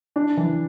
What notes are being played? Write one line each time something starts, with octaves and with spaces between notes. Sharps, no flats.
D4
E3